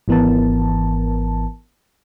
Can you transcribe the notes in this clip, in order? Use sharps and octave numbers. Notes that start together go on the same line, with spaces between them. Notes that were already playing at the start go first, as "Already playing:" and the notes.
G#1 E3 B3 A#4 A5